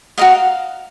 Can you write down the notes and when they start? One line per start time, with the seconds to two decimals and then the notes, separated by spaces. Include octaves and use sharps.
0.18 F#4 A#4 D#5 F5